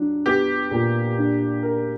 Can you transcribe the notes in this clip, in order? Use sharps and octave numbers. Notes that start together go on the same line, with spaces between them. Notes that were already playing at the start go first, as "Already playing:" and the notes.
Already playing: F#3 D4
B3 G4
A#2
D4
A#4